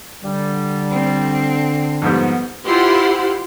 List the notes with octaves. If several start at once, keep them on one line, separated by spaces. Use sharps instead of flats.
D3 G3
C4
F2 G#2 G3 B3
E4 F4 G4 C5 F#5 C6